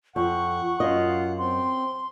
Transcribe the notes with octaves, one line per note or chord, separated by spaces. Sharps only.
F2 F#5 C#6
F#2 F4 D#5
C4 C6